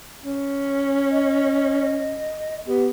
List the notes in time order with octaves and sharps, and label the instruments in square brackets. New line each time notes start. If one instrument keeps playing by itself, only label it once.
[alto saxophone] C#4
[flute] D#5
[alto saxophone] B3 [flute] G4